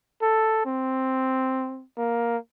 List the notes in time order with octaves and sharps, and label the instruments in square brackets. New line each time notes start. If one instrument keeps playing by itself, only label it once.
[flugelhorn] A4
C4
A#3